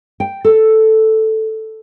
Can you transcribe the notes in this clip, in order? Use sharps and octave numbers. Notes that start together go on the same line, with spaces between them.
G5
A4